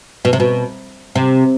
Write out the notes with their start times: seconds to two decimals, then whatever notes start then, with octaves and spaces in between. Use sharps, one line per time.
0.25 B2
0.33 C3
0.40 B2
1.15 C3